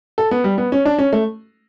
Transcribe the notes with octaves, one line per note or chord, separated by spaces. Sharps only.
A4
B3
G3
B3
C#4
D4
C#4
A3